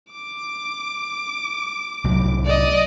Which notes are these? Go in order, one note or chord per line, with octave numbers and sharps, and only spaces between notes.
D6
C2 A2 F#3
D5 D#5